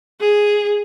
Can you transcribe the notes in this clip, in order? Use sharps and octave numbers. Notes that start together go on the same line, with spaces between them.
G#4